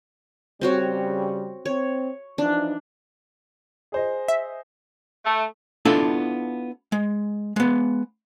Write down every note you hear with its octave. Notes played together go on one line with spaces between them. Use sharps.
C#3 G3 C4 F#4 C#5
C4 C#5
E3 F3 D4 D#4
G#4 C5 D#5
E5
A3
B3 D4 E4 F4 A4 A5
G#3
G#3 B3